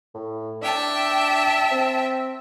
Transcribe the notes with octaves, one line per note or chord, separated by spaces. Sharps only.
A2
D4 E5 G5 A5
C4